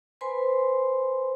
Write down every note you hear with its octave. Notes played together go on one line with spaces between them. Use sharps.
B4 C5 G#5 B5 C6